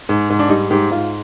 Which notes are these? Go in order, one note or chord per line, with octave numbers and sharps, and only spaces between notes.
G#2
G#2
D4
G3 D#4
G#2 G4
G#2 F4